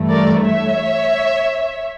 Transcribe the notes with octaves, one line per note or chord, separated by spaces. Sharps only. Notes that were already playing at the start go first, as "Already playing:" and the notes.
Already playing: G2 E3 A3
A#4 D5
C#5 E5